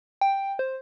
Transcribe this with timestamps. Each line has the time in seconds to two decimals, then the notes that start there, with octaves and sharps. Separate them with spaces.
0.21 G5
0.59 C5